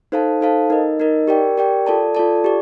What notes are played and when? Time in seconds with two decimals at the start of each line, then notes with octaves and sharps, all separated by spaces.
0.12 D#4 A4 C5 F5 A5
0.41 D#4 A4 C5 F5 A5
0.70 D#4 A#4 D#5
1.00 D#4 A#4 D#5
1.28 G4 A#4 D5 G5
1.57 G4 A#4 D5 G5
1.87 F4 A4 D5 A5
2.15 F4 A4 D5 A5
2.44 G4 D5